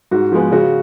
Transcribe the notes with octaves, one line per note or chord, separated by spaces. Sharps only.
G#2 F#4
F3 G#3 B3
C#3 F#4